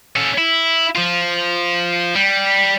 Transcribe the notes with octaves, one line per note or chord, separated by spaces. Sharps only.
C#4 A4
E4
F3 F4
G3